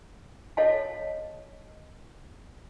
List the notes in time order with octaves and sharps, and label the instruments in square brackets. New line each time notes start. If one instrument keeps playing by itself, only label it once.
[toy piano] A4 C#5 D#5 F5 A5